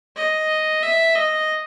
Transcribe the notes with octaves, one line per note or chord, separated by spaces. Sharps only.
D#5
E5
D#5